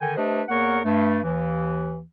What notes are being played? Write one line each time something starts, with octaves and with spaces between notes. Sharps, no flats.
D3 D#3 G5 G#5
A3 D4 G4 B4 C5 D#5
E2 A#3 A#4 C#5 F#5 C#6
G2 A3
D#2 E3